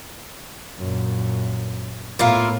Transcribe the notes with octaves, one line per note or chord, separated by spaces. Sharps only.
F#2 A#2
A2 A#3 B3 E4 F4